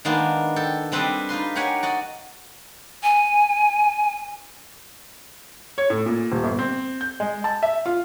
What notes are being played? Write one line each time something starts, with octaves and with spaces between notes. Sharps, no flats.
D#3 G#3 A#3 B3 D4
A4 G5
G3 C4 D4 B4 C5 D#5
D#4 F4 B4 C6
G4 A#4 C#5 F#5 G#5
F#4 D5 D#5
G#5
C#5
A2
A#2
D#1
G1
C4
G6
G#3
A5
E5
F4